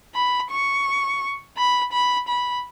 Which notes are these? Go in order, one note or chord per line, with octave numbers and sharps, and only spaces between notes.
B5
C#6
B5
B5
B5